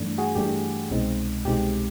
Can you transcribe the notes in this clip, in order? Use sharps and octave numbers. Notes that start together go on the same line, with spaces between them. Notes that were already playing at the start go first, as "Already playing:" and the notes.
Already playing: G2 E3 A3 D4
F#4 G#4
G2 E3 A3 D4 G4
C2 B2 G#3 C4 D#4
C2 B2 G#3 C4 D#4 G4